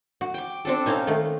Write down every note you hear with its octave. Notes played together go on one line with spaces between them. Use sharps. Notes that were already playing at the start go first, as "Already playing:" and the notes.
F#4
G5 D6
C4 D4 A4
B2 C4 C#4 D#4 F5
D#3 A3